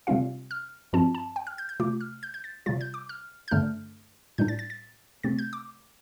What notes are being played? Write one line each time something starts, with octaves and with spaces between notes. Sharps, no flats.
C3 G3 C4 F4 F5
F6
G2 F3 C4 F4 A5
A5
G5
F6
G6
G6
C3 A3 F4 D6
F6
G6
G6
A6
C3 G3 F4 A6
G6
D6
F6
G6
G2 D3 A3 D4 F6
A2 G3 D4 G6
A6
A6
A6
C3 A3 C4 A6
G6
D6